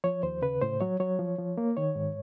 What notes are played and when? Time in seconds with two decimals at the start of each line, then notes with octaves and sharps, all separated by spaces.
0.04 F3 C#5
0.23 D#2 C5
0.42 C#3 B4
0.62 A2 C5
0.81 F#3 C#5
1.00 F#3 C#5
1.19 F3
1.39 F3
1.58 A#3
1.77 D#3 C#5
1.95 G#2